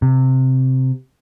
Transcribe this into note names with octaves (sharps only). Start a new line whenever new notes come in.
C3